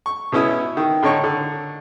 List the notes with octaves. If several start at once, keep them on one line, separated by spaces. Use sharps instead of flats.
C#6
B2 B3 C#4 E4 D#6
D#3
A2 D3 D#4 C#5 C#6
D3